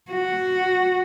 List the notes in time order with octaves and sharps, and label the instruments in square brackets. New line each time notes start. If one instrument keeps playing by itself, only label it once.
[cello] F#4